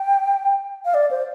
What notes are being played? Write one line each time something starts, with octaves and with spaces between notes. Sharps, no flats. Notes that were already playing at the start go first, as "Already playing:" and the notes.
Already playing: G5
F5
D5
C5